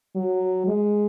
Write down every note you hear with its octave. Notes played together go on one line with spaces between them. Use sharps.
F#3
G#3